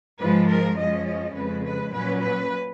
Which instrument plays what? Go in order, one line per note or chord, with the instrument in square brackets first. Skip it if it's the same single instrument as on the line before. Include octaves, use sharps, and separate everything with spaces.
[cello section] G#2 F3 G#3 B4
A#4
F#2 F3 G#3 C#4 D#5
D#5
F2 C#3 G#3 B4
B4
A#2 F#3 C#4 B4
B4